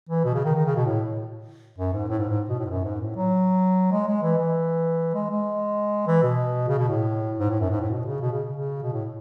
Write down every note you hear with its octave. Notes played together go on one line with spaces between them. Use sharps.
E3
B2
C#3
D#3
D#3
C#3
B2
A2
F#2
G#2
A2
G#2
G#2
B2
A2
G#2
F#2
G#2
A2
F#3
G#3
G#3
E3
E3
G#3
G#3
E3
B2
C#3
B2
A2
G#2
A2
F#2
G#2
A2
B2
C#3
B2
C#3
C#3
B2
A2